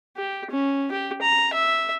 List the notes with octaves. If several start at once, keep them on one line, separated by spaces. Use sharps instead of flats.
G4
C#4
G4
A#5
E5